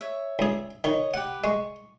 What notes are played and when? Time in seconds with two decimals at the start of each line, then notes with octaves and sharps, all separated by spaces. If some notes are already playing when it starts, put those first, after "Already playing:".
0.01 C#5 E5
0.39 C#2 G#4
0.84 D#3 C#5 D#5
1.14 G4 B4 F#5
1.44 G#3 C#6